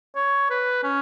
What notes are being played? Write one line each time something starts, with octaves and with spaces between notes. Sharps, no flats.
C#5
B4
C#4